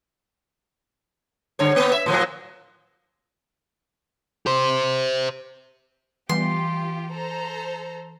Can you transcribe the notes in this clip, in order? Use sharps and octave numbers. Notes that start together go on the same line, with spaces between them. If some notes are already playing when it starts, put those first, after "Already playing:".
G2 D3 C#5
A#3 B3
E5
A2 F3 F#3
G4 C5
E3 G3 B3 F4 G4 C6
A4 C5 A#5